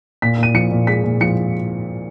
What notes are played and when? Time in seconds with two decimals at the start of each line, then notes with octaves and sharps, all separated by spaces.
0.22 A#2 B6
0.38 A#2
0.43 D#7
0.54 F3 C#7
0.72 A#2
0.87 G#3 B6
1.04 A#2
1.21 F3 C#7